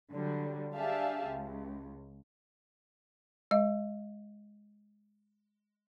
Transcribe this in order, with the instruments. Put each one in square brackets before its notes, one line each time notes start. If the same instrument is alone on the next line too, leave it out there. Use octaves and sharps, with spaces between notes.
[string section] D3 F#3 G3
D4 G4 G#4 E5 F5 A5
C#2
[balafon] G#3 D#5